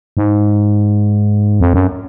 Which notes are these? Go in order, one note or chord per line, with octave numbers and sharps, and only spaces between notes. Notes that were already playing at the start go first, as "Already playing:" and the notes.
G#2
F2
F#2